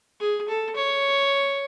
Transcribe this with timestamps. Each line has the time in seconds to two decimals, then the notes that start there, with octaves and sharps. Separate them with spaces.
0.20 G#4
0.49 A4
0.76 C#5